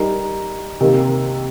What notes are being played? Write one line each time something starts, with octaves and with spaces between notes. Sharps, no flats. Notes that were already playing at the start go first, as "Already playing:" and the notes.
Already playing: G3 D#4 A#4
C3 D#3 A#3